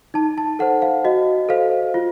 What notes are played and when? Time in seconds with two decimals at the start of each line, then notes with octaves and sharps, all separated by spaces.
0.14 D#4 A5
0.38 A5
0.59 A4 C5 F#5
0.82 F5
1.05 F#4 D#5
1.49 A4 C5 F5
1.94 F4